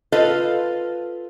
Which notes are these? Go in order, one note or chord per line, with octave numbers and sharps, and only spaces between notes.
F4 A4 B4 C5 D#5 F5